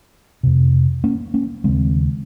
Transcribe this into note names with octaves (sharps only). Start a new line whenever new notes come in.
F2 C3
A#3 C#4
A#3 C#4
D#2 C#3 G#3 C4